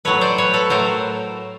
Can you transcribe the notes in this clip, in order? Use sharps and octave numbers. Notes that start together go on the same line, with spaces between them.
A2 F#3 A3 B4 C#5
C5 D5
B4 C#5
A4 B4
A2 F#3 A3 A#4 C5